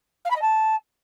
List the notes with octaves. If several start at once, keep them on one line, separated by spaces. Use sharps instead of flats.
F5
B5
D#5
A5